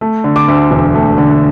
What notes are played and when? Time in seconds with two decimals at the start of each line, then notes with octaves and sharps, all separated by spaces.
0.01 A3
0.24 D3
0.36 D6
0.48 D2
0.71 E1
0.95 A3
1.18 D3